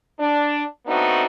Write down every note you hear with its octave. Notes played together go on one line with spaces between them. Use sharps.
D4
A3 B3 C4 D4 D#4 F#4